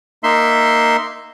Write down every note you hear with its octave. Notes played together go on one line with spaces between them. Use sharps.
A#3 D#4 E5 C6